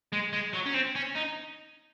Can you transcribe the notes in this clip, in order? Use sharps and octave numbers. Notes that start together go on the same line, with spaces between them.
G#3
G#3
F#3
C#4
C4
C#4
D#4